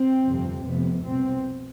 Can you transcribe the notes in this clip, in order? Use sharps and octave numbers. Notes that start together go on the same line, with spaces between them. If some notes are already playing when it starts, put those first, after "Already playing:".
Already playing: C4
G1 F2 C3
F1 F2 C3 B3
C2 B2 C4